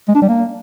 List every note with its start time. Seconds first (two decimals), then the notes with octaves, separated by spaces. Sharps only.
0.08 G#3
0.15 D4
0.22 G3
0.29 A#3